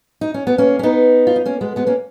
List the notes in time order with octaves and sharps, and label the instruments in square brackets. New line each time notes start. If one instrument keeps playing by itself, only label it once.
[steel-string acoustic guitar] D#4
C#4
B3
A#3 C#4
C#4
B3 D#4
F4
D#4
A#3 C#4
G#3 B3
G#3 B3
A#3 C#4